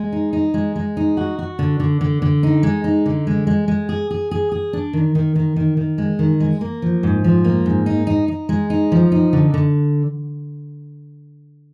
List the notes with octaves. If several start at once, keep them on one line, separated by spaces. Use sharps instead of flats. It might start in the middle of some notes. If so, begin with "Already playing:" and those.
Already playing: G#3
D#4
D#4
G#3
G#3
D#4
F#4
F#4
D3
D3
D3
D3
D#4
G#3
D#4
D3
G#3
G#3
G#3
G#4
G#4
G#4
G#4
D4
D#3
D#3
D#3
D#3
D#3
G#3
D#3
G#3
A#3
F3
G#2
F3
A#3
G#2
D#4
D#4
D#4
G#3
D#4
F3
D#4
D3
D3